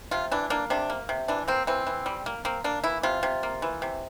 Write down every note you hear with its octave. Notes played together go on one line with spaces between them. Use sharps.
C3 F4
E3 D4
A#3 D4
C3 D4
A#3
C3
E3 D4
A#3 C4
E3 C4
E3
G3
A#3
A#3 C4
A#3 D4
E3 E4
C3 F4
C3
A#3
E3
C3